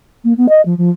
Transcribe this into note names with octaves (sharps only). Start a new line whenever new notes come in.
A#3
B3
D#5
F3
F3